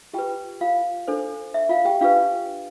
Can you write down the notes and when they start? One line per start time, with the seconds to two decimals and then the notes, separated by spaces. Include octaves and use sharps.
0.14 F4 G4 B4 G5
0.61 F4 F5
1.08 D4 A4 C5
1.54 E5
1.69 F4 F5
1.85 G4 G5
2.01 D4 F4 G4 B4 F5